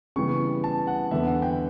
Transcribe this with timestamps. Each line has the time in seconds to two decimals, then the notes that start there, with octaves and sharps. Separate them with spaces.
0.16 C#3 E3 G3 B3 C#6
0.64 A5
0.87 F#5
1.11 E2 D3 G3 B3 E5
1.27 F#5
1.42 G5